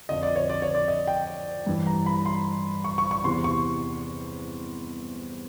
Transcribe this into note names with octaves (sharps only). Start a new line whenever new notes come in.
F2 D3 F3 D#5
D5
C#5
D5
C#5
D5
D#5
G5
G2 E3
A#5
B5
C6
C#6
C#6
C#6
E2 C3 E3 C6
C#6